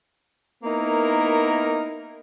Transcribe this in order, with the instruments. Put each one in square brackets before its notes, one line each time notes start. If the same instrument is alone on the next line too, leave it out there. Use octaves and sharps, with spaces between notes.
[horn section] A#3 B3 D#4 E4 A#4